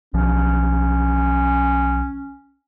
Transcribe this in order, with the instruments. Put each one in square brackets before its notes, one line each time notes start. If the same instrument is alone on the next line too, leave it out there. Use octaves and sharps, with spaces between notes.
[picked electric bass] B1 F3 [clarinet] C#4